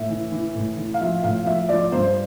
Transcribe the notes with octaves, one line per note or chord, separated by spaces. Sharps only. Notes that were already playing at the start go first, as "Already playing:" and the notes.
Already playing: A2 E5
E3
E3
A2
E3
F5
F3 E5
A2 F5
F3 E5
F3 D5
G2 C5